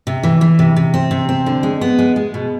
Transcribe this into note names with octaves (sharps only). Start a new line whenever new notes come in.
C3
E3
E3
C3
C3
C4
C3
C4
D3
G#3
B3
G#3
G#3
B2